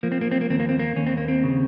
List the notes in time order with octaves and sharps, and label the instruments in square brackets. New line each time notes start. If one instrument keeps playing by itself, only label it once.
[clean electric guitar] F3 A#3
C4
A#3
C4
A#3
D#2 C4
A#3
C4
A#3
D#2 C#4
C4
A#3
C4
C#3